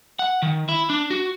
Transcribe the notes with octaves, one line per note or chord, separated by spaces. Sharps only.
F#5
D#3
E4
D4
F#4